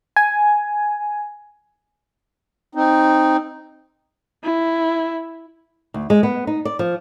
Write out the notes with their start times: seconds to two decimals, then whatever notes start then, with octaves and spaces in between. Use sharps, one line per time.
0.16 G#5
2.75 C4 D#4
4.44 E4
5.94 D2
6.10 G#3
6.23 B3
6.47 D#4
6.65 D5
6.79 F3